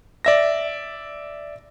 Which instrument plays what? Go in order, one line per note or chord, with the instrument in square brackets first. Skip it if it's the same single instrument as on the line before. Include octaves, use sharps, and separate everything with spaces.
[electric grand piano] D5 E5 A#6